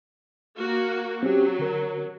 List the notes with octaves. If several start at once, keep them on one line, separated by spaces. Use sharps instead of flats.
A#3 F#4
F#3 C4 C#4 G4
D3 A#4